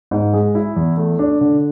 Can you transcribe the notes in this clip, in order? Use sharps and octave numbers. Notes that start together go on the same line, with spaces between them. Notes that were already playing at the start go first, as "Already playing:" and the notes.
G#2
G#3
E4
E2
A3
D4
D3